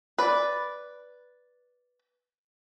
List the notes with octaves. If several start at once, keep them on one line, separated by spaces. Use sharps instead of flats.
B4 D5